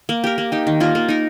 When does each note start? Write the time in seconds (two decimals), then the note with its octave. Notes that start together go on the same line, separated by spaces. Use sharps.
0.09 A#3
0.24 G4 A#4
0.38 A#3
0.52 D#4 G4
0.67 D#3
0.80 A#3 F4 A#4
0.95 A#3
1.08 D#4 A#4